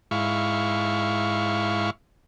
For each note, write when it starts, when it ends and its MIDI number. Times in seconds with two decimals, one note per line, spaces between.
0.11 1.90 44
0.11 1.90 64
0.11 1.90 77
0.11 1.90 85